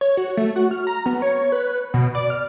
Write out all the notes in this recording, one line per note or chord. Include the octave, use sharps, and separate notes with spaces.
C#5
F#4
A3
F#4
F6
A#5
B3
C#5
B4
B2
D5
F6